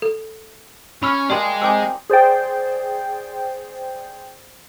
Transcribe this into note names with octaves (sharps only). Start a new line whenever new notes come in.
A4
C#4 B5 E6 F6
G3 A#3 G#4 D5 D#5 A5 C6
C4 D#4 G#5 A#5 D6 E6
G#4 C5 D5 G5